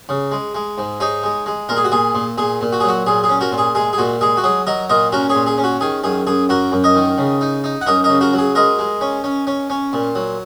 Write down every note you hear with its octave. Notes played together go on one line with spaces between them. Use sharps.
C#3
G#3
G#3
G#2
D#4 G#4 C#5
G#3
G#3
A#2 A#4
G#4
F#4
A#2 G#4
A#2
A#2 G#4
A#2
F#4
G#4
F#3 F#4
A#2 G#4
G#4
C#4
F#4 A#4
A#2
G#4
G#3 G#4
G#4
A#2 F#4
G#3 G#4
F#4
F#3 G#4
F#3 A#4 D#5
A#2 A#4 D#5
C#4 F#4 A#4
G#4 C#5
A#2
G#4
C#4
F#4
D#3 G#4
F#2 G#4
F#2 G#4
F#2 F#4 A#4
F#2
A#4 D#5
D#3
C#3
D#4
D#4
F#5
F#2 A#4 D#5
A#4 D#5
C#3
F#4 A#4
F#3
G#4
G#3 A#4 D#5
G#3
C#4
C#4
C#4
C#4
A#2
F#3